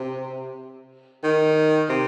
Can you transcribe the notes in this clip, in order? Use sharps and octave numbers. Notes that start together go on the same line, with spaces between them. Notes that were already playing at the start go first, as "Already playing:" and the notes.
Already playing: C3
D#3
C3